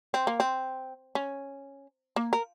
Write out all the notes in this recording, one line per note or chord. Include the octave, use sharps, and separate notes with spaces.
C4
A#3
C4
C#4
A#3
A#4